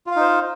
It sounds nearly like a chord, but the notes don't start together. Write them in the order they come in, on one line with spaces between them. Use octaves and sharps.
F4 F5 D#4 C5